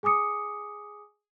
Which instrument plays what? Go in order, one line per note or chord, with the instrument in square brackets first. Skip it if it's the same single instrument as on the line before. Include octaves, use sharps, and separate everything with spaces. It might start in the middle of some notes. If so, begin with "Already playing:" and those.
[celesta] G#4 G#5 D6 D#6 C#7